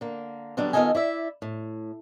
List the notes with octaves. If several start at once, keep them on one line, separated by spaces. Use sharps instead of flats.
D3 A#3
D3 F#3 G3 B3 D4
D#3 B3 F4 A4 D#5 G#5
E4 D5 E5
A2